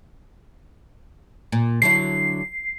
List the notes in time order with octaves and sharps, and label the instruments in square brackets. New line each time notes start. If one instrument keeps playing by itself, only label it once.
[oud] A#2
[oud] D3 F#3 E4 [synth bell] C7